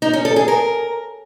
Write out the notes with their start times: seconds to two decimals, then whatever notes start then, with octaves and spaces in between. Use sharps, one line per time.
0.02 D#4
0.13 C#4
0.25 A4
0.36 G#4
0.48 A#4